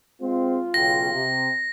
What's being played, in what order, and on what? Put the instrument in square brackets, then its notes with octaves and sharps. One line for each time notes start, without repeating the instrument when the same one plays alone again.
[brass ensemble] G#3 C4 [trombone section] F4
[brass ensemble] B1 C#3 G5 [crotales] A#6
[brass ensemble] C3